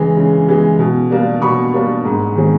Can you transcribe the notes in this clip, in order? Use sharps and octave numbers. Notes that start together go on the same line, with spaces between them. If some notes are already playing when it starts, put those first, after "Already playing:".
Already playing: C#3 E3 G#3
C#3
E3 G#3
B2
G3 A#3 D4
B2 B5 C#6
G3 A#3 D4
G#2
D#3 G#3 C4